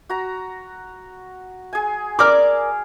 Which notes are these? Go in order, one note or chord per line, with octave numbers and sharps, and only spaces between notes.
F#4 A#5
G#4 G#5
A#4 D5 D6 F6